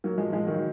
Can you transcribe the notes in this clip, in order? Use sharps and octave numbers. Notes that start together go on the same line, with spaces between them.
F#3 A#3
F3 G#3
F3 G#3
D#3 F#3